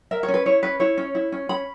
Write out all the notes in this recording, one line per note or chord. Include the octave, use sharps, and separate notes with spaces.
A#4 E5
C#5
C#4
B4
E4 C#5
C#4 B4
E4 C#5
C#4
E4
C#4
C#4 B5